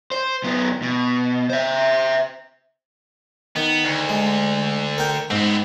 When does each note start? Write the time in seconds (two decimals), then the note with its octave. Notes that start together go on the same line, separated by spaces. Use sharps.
0.11 C5
0.44 F#2 B3
0.82 B2
1.50 C5 E5
3.56 D#3 B3
3.84 D2
4.09 G#3
4.98 A#4 G5
5.30 G#2 B3 C4